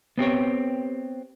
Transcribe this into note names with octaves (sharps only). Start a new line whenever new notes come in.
B3 C4 G4 C#5